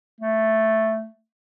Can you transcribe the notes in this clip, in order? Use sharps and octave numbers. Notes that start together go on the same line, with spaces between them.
A3